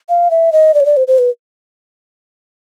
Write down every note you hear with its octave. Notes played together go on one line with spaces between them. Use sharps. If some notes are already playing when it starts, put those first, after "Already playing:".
F5
E5
D#5
D5
C#5
D5
C5
C5
B4